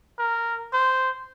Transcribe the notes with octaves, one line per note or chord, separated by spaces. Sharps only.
A#4
C5